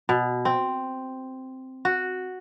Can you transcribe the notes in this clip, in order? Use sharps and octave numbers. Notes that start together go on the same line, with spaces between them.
B2
C4
F#4